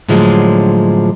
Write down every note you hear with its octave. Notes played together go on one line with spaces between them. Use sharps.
A2 D3 F3 F#3 G#3